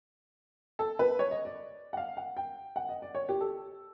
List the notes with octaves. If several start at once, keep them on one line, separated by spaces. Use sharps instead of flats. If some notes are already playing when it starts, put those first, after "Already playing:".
A4
B4
C#5
D#5
D5
F#5
F5
F#5
G5
F#5
D#5
D5
C#5
G4
A4